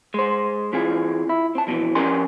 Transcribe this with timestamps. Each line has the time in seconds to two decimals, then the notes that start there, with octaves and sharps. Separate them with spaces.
0.14 G#3 C5
0.73 E3 C4 F4 G#4
1.29 E4
1.55 C4 A5
1.67 F2 B2 D3 E3
1.95 F3 C#4 G4 A#4 G#5 C6